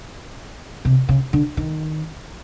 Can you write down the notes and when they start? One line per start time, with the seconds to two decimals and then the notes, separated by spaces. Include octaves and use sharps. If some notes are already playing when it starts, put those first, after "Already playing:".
0.85 C3
1.09 C#3
1.33 D3
1.57 D#3